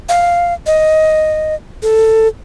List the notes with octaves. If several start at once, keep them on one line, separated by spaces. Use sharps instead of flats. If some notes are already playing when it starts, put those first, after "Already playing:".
F5
D#5
A4